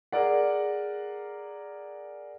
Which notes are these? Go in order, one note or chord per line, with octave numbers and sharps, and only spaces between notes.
G#4 A#4 D5 F#5